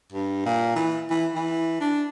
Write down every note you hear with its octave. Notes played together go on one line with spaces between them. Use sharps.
G2
A#2
E3
E3
E3
D4